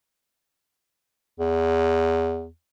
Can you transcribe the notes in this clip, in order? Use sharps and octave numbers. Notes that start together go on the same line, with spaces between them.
E2